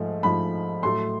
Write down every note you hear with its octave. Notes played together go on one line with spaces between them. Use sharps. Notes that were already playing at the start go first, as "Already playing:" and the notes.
Already playing: G#2 F3 A3
G#2 F3 A3 B5
A2 F#3 A3 C6